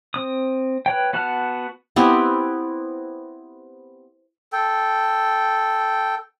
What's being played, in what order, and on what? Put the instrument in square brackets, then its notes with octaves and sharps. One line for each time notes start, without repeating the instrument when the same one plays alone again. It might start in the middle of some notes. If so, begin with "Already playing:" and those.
[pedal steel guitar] C4 D#6
B4 C#5 G5
B3 F#4 F#5 A5 F6
[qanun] B3 C4 E4 G4
[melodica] A4 G5